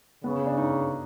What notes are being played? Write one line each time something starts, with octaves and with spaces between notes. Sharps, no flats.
C#3 B3
C#4
D4
D#4